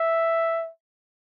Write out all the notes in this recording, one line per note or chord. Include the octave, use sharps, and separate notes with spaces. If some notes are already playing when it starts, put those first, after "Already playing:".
Already playing: E5